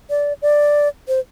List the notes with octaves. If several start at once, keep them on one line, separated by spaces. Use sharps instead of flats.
D5
D5
C5